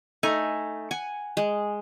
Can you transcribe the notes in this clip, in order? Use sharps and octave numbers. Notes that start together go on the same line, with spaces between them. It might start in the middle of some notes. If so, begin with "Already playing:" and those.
A3 D#4 G#5
F#5 G#5
G#3